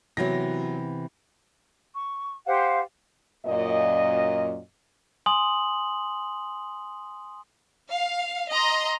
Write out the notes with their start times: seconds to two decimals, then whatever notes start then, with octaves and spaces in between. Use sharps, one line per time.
0.17 C3 E3 F#3 B3 A#6
1.95 C#6
2.46 G4 C5 F5 F#5
3.46 F#2 A#2 D#5
5.26 G#5 C6 D#6 F#7
7.91 F5
8.51 D#5 A#5 C6